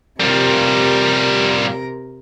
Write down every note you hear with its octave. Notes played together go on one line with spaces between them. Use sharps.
C3 G3 F4 A#4